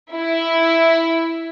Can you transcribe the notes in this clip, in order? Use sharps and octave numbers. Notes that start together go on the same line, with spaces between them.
E4